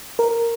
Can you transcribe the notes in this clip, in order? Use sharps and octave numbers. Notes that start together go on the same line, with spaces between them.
A#4